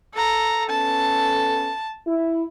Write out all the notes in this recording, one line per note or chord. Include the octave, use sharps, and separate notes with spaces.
A4 A#5
B3 C#4 A4 A5
E4